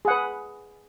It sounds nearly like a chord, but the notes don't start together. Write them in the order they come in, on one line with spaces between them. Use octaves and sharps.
G#4 F#5 B4